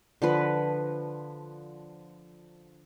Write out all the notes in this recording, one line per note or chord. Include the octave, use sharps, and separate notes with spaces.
D3 F3 B4